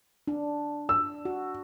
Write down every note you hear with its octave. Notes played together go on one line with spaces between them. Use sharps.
D4
E6
F#4